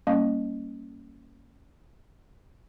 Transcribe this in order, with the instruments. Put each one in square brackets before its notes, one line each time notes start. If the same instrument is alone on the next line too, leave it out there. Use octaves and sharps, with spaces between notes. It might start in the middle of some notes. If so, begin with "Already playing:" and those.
[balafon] G3 A#3 C#4